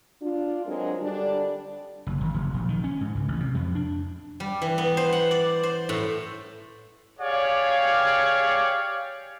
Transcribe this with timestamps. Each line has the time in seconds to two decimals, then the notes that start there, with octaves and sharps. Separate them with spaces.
0.21 D4 F4
0.66 F#3 G#3 C4 D4 G#4 A#4
1.00 D3 G3 D4
2.07 F#1
2.21 G#1
2.34 F#1
2.54 A#1
2.68 D#3
2.84 C#4
3.01 G#2
3.15 C#2
3.28 A1
3.40 C3
3.54 F2
3.75 D4
4.40 G3
4.62 E3
4.78 B3
4.97 C5
5.12 F#5
5.31 D5
5.63 C5
5.89 A2
7.20 G4 G#4 C#5 D5 F5